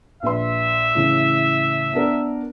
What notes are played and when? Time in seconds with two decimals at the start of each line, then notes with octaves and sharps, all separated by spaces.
0.23 A#1 B4 E5 C6
0.95 A2 C#3 E3
1.93 B3 D4 A#4